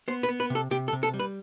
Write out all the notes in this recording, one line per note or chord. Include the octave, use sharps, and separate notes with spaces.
B3 C5
B4
B3
B4
C3 A4
C3 G4
A4
C3
A4
G3
B4